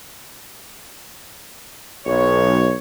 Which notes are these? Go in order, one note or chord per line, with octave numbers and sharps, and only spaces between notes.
B1 C#5